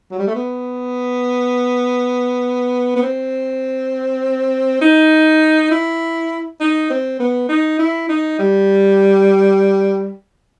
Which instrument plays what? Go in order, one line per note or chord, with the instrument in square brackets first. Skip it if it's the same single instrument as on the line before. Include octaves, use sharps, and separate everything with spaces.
[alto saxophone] F#3
G3
A3
B3
B3
C4
D#4
E4
D#4
C4
B3
D#4
E4
D#4
G3